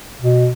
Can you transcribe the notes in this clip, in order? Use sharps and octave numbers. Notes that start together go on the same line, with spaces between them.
B2